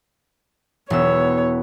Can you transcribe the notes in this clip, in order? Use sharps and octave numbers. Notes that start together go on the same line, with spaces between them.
E1 B3 C#5 E6